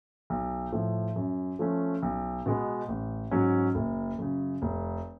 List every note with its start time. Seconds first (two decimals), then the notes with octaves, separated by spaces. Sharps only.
0.30 B1
0.72 A2 F3
1.16 F#2
1.59 F3 A3 C#4
2.02 B1
2.46 B2 G#3 B3
2.88 A1
3.31 G#2 F#3 C#4
3.75 F#1
4.19 F#2 C#3
4.62 F1